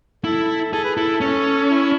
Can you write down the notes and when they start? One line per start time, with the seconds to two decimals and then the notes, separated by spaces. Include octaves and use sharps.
0.24 E4 A4
0.73 G#4 A4
0.84 B4
0.96 E4 A4
1.21 C#4 A4
1.70 E4